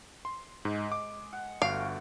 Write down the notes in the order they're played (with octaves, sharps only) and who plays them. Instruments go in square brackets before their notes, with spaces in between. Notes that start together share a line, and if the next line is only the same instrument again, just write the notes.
[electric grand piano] C6
[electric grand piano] G#2 [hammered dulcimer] G#3
[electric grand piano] D6
[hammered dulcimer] F#5
[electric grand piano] G1 D7 [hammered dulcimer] A3 F#4 [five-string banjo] F5